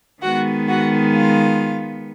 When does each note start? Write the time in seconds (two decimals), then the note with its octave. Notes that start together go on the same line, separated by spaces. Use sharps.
0.22 D#3 G#3 B3 F#4 F#5
0.68 F#4 F#5
1.14 F4 F5